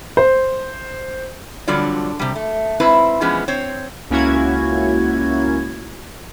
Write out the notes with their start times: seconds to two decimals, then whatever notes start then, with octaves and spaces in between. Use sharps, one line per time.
0.17 C5
1.67 F2 D3 F#3 G3 F4 D5
2.19 C3 G3
2.36 A3
2.80 G#2 C4 E4 B4
3.21 E3 F3 G#3 B3 C#4
3.48 C4 C5 C#5
4.10 C#2 A#3 C#4 E4 F#4 G#6